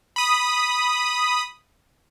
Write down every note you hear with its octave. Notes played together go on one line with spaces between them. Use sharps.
B5 D#6